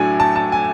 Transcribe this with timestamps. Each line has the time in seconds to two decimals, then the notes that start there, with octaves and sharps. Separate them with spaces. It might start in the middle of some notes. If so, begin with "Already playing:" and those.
Already playing: A2 F#3 A3 D4 G#5
0.20 A5
0.36 A5
0.52 G#5